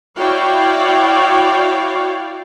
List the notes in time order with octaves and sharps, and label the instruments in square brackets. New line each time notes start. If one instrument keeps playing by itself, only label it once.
[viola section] E4 F#4 C#5 D5 F5 G5